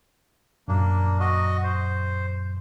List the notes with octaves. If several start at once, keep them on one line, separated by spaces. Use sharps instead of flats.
F#2 A#2 F#3 A#3 D4
F#4 D#5
C5